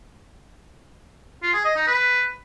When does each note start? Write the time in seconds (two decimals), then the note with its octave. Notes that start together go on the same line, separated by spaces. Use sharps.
1.43 F4
1.54 G#4
1.65 D#5
1.76 D#4
1.87 B4